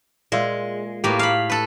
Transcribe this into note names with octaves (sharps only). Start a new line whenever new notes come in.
A#2 G#3 F4 E5
A2 A#3 G4 B4
F5 B5
A4 B4